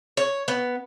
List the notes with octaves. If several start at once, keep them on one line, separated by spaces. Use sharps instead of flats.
C#5
B3